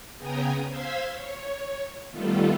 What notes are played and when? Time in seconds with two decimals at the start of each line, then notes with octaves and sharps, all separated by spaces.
0.18 C#3 B3 G5 G#5 A#5 D#6
0.67 C5 F5 C6 E6 G#6 B6
1.12 C#5
2.11 D#3 G3 A3 B3 F4 A4